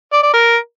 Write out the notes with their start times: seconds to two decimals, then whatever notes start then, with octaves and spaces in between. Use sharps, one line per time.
0.13 D5
0.23 D5
0.34 A#4